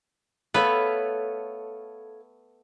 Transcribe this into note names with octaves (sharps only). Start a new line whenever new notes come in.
A3 B3 A4 B4 C#5 F5